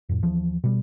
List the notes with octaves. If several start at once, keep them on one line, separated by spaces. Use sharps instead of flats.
F2 A2
D#2 E3 F3
B2 G3